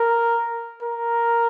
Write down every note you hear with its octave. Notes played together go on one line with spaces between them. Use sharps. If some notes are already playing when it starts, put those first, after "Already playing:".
Already playing: A#4
A#4